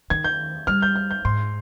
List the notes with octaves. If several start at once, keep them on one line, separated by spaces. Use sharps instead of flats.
D#3 G#6
G6
G3 F6
G6
F6
G6
G#2 C6